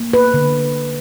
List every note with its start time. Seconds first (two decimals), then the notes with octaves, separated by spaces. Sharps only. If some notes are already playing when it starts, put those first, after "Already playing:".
Already playing: A#3
0.13 B4
0.34 D3